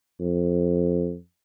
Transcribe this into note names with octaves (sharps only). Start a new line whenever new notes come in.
F2